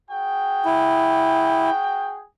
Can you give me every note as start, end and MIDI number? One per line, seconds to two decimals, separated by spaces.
0.10 2.21 66
0.10 2.21 68
0.10 2.21 79
0.65 1.70 64